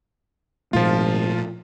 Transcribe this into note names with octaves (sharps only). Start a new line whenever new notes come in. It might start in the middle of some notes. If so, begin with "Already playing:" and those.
G#1 A#2 F3 A3 F4